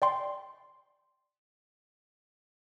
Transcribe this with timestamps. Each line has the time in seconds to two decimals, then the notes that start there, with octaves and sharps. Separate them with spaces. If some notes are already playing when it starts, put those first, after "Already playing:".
0.02 D5 G5 C6